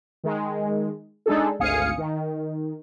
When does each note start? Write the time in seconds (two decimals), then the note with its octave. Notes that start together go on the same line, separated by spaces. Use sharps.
0.24 D#3 G#3
1.26 G#3 D4 D#4 G#4 A4
1.59 G#1 D2 F5 G#5 D#6 C#7
1.98 D#3